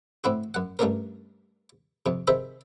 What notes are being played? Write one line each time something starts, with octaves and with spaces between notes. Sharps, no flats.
A2 C4 E4 F#4
F#2 F#5
G2 G3 A3 A#3 C#4 A#4
F2 C3
C3 D#3 G#4 C5 E5 B5